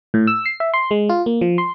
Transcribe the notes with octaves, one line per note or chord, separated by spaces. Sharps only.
A2
E6
C7
E5
C6
G#3
F4
A#3
F3
C6